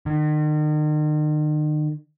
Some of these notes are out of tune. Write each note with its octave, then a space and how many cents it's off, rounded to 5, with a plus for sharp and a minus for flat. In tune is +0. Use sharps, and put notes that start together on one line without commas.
D#3 -40